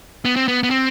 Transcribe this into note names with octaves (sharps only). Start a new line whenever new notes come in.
B3
C4
B3
B3
C4